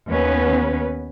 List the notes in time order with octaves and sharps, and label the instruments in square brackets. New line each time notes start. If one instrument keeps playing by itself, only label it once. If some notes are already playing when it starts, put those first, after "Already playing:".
[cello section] D#2 B3 C#4 B4